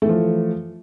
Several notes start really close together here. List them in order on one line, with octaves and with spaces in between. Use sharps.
A3 E3 F3